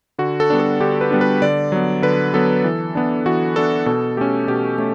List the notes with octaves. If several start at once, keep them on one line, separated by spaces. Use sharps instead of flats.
D3 F#4
A4
G3 B3 D4
A4
D3 G4
B4
G3 B3 D4
B4
D3 D5
F#3 B3
D3 B4
F#3 B3 A4
E3
B3 D4
E3 F#4
B3 D4 A4
B2 A4
A3 C#4 G4
B2 G4
A3 C#4